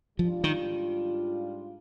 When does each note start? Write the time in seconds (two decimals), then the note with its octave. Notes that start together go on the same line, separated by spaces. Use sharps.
0.19 G#2 F3 G3 D4 F4
0.44 D#3